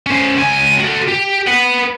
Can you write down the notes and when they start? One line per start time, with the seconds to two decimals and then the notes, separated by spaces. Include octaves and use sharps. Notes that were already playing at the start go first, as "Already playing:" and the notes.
0.06 C#4 C5
0.37 C#2 G#5
0.80 F#4 A4
1.08 G4
1.47 B4 F#5